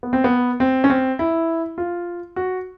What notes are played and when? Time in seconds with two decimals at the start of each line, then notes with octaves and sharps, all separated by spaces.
0.03 B3
0.13 C4
0.24 B3
0.60 C4
0.84 C#4
0.90 C4
1.19 E4
1.78 F4
2.36 F#4